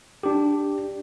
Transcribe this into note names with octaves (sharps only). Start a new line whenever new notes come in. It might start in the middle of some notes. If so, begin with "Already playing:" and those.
D4 G4